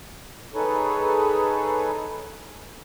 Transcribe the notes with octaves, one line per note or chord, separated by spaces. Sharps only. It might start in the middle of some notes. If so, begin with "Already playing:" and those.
D#4 G#4 A4 B4 C#5